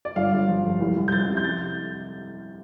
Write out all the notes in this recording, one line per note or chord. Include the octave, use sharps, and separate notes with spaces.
D5
G1 F5
G1
F3
F2
C2
C2
G6
F3 A6
C3
G6
A6